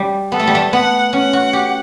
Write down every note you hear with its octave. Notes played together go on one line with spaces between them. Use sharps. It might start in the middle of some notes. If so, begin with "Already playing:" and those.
Already playing: G3
B3 A4
A3
G3
A3
B3 F#5
C#4 F#5
F#4
G4